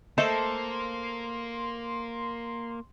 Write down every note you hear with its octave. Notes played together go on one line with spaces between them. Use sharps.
A3 A#3 A4 C5 D#5 C6